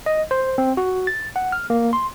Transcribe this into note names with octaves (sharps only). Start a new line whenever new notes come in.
D#5
C5
C4
F#4
A6
F#5
F6
A#3
C6